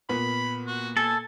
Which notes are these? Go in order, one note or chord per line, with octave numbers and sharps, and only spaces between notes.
A#2 B3 B5
F#4
A4 G#5